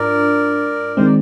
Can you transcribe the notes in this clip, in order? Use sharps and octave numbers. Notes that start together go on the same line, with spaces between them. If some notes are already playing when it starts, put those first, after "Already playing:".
Already playing: G#2 D4 F4 A#4 D5
D#3 G#3 C4 C5
D5